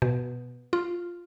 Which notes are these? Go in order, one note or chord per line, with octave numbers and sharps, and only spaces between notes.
B2
F4